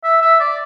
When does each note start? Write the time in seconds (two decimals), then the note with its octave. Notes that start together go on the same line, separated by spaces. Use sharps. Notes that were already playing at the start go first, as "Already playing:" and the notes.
0.04 E5
0.22 E5
0.40 D5